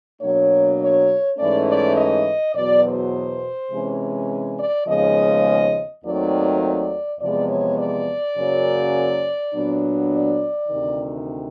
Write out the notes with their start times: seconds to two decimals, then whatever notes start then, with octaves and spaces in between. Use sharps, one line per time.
0.21 B2 F#3 A#3 D4 C#5
0.79 C#5
1.37 G#2 E3 A3 C#4 D5
1.67 D5
1.96 D#5
2.54 E2 B2 F#3 B3 D5
2.83 C5
3.70 C3 E3 G#3 C#4
4.58 D5
4.87 D#2 C#3 F3 G#3 B3 D#5
6.03 D#2 D#3 F#3 A3 C4 D5
6.61 D5
7.19 E2 C3 F3 G#3 B3 D5
7.48 C#5
7.78 D5
8.36 F#2 C#3 F#3 A#3 C#4
9.52 A#2 F#3 B3 D4
10.11 D5
10.68 D2 C3 D#3